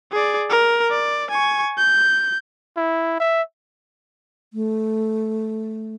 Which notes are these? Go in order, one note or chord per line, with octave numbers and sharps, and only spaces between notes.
G#4 D5
A#4
D5
G#5 C#6
G6
E4
E5
A3